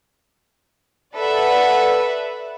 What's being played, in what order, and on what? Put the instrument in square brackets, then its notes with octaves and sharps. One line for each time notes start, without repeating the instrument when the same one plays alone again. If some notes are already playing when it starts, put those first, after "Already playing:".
[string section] A4 B4 D5 E5 F#5